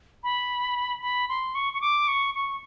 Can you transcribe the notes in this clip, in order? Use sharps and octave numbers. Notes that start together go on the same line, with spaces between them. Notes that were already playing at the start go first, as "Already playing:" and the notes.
B5
B5
C6
C#6
C#6
D6
C#6
C#6